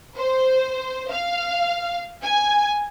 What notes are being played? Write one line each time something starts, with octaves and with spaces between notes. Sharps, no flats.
C5
F5
G#5